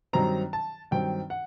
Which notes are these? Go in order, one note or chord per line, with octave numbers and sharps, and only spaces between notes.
G2 D#3 F#3 C4 A#5
A5
G2 D#3 F#3 C4 G5
F#5